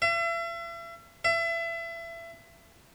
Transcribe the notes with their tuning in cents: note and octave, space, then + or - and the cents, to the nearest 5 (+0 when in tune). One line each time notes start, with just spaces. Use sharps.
E5 +40
E5 +30